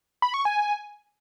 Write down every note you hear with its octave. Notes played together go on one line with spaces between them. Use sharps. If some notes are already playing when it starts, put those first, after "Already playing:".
B5
C#6
G#5